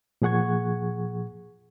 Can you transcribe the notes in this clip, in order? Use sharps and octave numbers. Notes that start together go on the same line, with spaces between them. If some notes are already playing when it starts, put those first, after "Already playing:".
A#2 F3 G#4 F#5 C#6 G#6